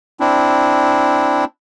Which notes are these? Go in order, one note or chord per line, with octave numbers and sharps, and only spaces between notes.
C4 D4 E4